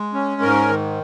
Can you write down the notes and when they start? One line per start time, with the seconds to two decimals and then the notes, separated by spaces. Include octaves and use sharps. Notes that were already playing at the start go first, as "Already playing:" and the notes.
Already playing: G#3
0.14 C#4
0.42 G#2 A#4
0.68 D#3